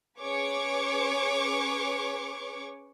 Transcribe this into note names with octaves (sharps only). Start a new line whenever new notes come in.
C#4 G#4 B4 C#5 C#6 D6